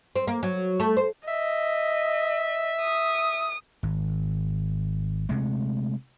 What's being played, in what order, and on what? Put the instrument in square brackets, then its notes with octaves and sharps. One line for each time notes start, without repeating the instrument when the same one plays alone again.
[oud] C4
A#3
F#3
A3
C5
[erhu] D#5 [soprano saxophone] E5
[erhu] D#6
[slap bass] G#1
C3 G#3 A3